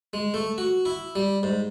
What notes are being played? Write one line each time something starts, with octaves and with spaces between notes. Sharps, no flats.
G#3
A3
F#4
E4
G3
G#2